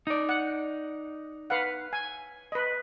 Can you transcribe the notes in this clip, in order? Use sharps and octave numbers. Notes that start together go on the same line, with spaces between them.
D#4 D5
F#5
B4 F5 F#5
G#5
B4 D#5